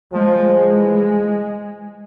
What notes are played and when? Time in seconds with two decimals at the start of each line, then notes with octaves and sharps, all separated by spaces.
0.12 F3 G#3
0.44 G#3
0.75 E3